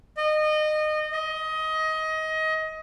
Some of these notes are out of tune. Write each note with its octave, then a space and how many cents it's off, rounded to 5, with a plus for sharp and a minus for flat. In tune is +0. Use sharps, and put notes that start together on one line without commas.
D#5 -25
D#5 +20